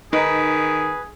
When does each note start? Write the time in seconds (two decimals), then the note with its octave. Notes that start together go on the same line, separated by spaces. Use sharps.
0.13 D#3 D#4 G#4 B4